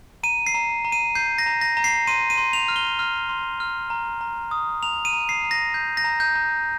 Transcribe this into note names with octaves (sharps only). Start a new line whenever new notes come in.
A#5 D#7
C7
A#5
A#5
D#7
G6 C7
A#6
A#5
A#6
A#5
C7
C6 D#7
D#7
C6
F7
F6
G7
F6
C6
F6
A#5
A#5
D#6
A#5 F7
D#7
A#5
C7
A#5
A#6
G6
A#6
A#5
G6
A#5